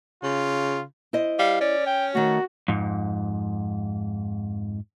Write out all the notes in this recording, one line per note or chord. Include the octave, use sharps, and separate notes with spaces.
C#3 F4
E4 C5 D#5
G3 F5
C#4 D5
G5
D#3 A3 F#4
F2 G#2